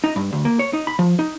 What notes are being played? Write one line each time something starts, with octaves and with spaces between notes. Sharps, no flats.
D#4
G2
D2
A#3
C#5
D#4
B5
F3
D#4